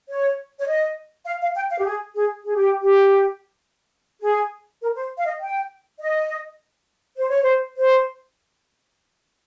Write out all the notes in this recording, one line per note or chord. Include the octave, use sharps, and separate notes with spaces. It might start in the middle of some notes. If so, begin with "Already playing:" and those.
C#5
C#5
D#5
F5
F5
G5
F5
G4
G#4
G#4
G#4
G4
G4
G#4
A#4
C5
F5
D#5
G5
D#5
C5
C#5
C5
C5